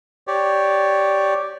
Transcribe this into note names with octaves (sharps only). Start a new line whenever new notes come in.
G4 C#5 D5